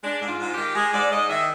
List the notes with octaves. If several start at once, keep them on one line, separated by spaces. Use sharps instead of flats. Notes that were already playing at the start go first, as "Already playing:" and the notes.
G#3 D4
G#2
F4
G#2
G4
D#3
G#3 G#4
G#2 D5
G#2 D#5
D#3 E5